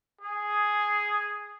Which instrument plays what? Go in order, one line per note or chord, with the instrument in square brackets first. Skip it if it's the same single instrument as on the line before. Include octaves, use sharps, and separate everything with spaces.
[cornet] G#4